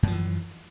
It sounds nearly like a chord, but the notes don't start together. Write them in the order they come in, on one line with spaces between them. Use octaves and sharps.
F#2 F3 E3